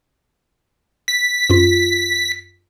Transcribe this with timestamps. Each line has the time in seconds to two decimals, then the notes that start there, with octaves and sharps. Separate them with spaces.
1.08 B6
1.50 F#2 F4